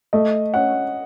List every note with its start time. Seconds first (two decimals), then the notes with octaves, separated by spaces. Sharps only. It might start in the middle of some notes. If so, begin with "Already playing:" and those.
0.13 A3 D#5
0.54 C#4 F#5